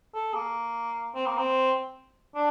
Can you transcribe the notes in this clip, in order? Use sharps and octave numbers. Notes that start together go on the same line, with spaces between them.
A4
A#3
C4
A#3
C4
D4